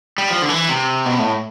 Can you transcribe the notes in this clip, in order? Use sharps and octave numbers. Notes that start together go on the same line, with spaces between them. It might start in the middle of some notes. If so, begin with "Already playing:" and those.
G3
F3
D3
E3
C3
B2
A2